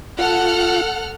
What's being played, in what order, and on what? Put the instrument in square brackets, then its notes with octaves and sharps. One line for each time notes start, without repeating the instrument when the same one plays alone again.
[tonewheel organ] F4 [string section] A4 F#5 F6